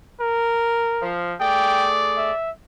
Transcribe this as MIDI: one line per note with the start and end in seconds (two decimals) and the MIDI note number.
0.20 1.09 70
1.02 1.33 53
1.40 2.31 57
1.40 2.31 68
1.40 2.31 74
1.40 1.89 79
2.17 2.51 76